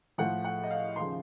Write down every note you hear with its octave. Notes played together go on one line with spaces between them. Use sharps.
A2 F3 F#5
F#5
D#5
F5
D#2 C#3 F3 C6